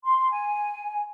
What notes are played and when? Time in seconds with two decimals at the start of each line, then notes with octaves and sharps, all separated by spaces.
0.04 C6
0.32 G#5